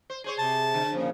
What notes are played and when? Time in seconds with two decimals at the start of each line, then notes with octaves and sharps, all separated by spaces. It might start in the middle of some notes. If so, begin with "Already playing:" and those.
0.10 C5
0.24 G#4 C5 C#5
0.39 C3 A5
0.74 D3
0.92 A#2 C#3 F3